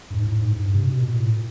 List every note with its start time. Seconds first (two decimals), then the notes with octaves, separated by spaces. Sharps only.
0.10 G2
0.14 G#2
0.27 A2
0.40 G#2
0.53 G2
0.74 C3
0.88 B2
1.02 A#2
1.15 A2